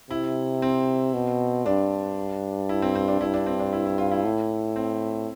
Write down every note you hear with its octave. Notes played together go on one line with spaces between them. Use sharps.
C3 E4
C4
B2
G2 D4
E4
C4
C4
D4
G2 E4
D4
C4
D4
E4
E4
F4
E4
A2
C4